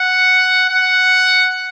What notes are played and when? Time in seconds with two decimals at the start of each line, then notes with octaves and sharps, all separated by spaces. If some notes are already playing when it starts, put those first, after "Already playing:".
Already playing: F#5
0.70 F#5